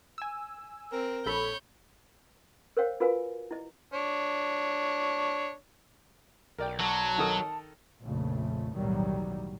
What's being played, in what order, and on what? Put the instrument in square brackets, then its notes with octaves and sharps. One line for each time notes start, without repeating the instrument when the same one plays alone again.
[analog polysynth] G#5 E6
[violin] C4 [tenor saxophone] A#4
[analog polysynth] A#1 A4 B5 [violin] C#5 G6
[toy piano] A#4 C5 C#5 F5 G5
F4 F#4 A#4 B4 F5 G#5
E4 D#5
[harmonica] D4 C#5
[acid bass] B1 [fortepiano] A#4 D5 G5
[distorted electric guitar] F#3 [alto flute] A5
[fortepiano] D#3 A4 D#6
[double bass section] A#1 F2 C#3 A3
B1 E2 A2 D#3 F#3 G3